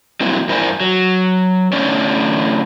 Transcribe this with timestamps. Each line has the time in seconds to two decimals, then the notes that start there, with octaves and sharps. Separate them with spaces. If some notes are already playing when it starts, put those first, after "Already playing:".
0.20 F#3 G3 A#3 C4 E4
0.49 G2 E4 A#4 C5 D5 G#5
0.80 F#3
1.73 A2 D3 C#4 C#5 D5